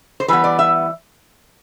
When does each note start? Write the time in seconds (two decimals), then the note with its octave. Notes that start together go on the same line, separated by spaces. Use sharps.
0.20 C5
0.28 E3 G3 B3 B4
0.44 D5
0.59 E5